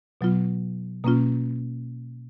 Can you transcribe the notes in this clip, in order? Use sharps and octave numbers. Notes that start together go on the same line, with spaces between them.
B2 F#3 B3 F4
B2 A#3 C#4 F4